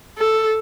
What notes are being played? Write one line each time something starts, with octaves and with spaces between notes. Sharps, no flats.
A4